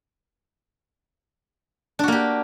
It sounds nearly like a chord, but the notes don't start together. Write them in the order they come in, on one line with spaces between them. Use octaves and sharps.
D4 F#4 A#3 G4